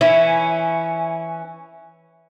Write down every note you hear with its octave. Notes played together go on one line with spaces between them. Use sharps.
E3 C#4 E4